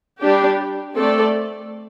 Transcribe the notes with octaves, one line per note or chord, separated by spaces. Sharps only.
G3 D4 G4
A3 C4 A4 D5